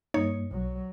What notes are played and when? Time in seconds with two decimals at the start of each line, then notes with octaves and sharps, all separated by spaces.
0.14 G2 A#3 D#4 C#5
0.51 B1 F#3